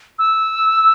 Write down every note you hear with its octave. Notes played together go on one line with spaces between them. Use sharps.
E6